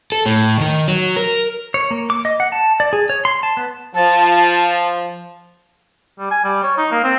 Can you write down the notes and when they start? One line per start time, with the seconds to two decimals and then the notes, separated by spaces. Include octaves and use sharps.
0.12 A4
0.26 A2
0.60 D#3
0.88 F#3
1.16 A#4
1.74 C#5
1.91 A#3
2.10 D6
2.25 D#5
2.40 F#5
2.52 A5
2.80 D5
2.93 G#4
3.09 C#5
3.25 C6
3.43 A5
3.57 B3
3.95 F3 A5
6.19 G3
6.31 G#5
6.44 G3
6.63 C#5
6.78 D#4
6.92 A#3
7.04 C4